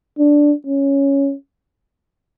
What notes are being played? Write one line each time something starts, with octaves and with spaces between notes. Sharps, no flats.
D4
C#4